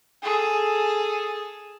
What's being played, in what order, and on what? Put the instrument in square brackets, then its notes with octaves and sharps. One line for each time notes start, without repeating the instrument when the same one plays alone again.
[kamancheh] G#4 A4